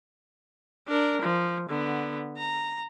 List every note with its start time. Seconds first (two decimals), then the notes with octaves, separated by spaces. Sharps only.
0.88 D4 A#4
1.22 F3
1.69 D3 B3
2.38 A#5